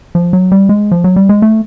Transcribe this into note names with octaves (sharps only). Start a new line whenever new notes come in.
F3
F#3
G3
G#3
F3
F#3
G3
G#3
A3